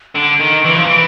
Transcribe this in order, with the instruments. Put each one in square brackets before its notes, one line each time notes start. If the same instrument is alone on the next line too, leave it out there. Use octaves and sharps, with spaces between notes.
[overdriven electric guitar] D3 [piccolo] D7
[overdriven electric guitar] D#3
E3
F3
E3